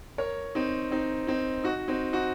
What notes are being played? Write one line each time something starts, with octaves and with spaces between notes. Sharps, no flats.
A#4 C#5
C4 D#4
C4 D#4
C4 D#4
D#4 F#4
C4 D#4
D#4 F#4